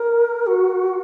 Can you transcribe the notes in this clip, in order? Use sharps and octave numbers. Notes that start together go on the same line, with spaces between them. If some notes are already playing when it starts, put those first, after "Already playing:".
Already playing: A#4
F#4